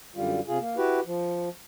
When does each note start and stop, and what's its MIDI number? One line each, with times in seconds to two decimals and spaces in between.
0.15 0.40 42
0.15 0.40 50
0.15 0.40 55
0.15 0.40 65
0.47 0.58 48
0.47 0.58 65
0.47 0.58 68
0.59 0.76 58
0.77 1.00 64
0.77 1.00 66
0.77 1.00 67
0.77 1.00 71
1.06 1.49 53